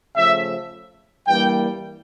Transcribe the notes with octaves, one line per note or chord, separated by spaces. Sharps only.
C#3 F3 A3 E5
G2 E3 G3 A#3 G5